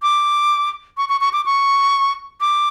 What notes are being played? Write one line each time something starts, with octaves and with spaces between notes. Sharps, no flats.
D6
C#6
C#6
C#6
D6
C#6
D6